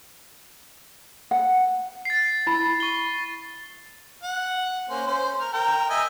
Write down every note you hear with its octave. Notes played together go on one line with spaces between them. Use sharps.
F#5
A6 C7
E4 B5
C#6 G7
F#5
A#3 C#4 C5
C#4 C5
A#4
A#4 G5
D#5 E5 G#5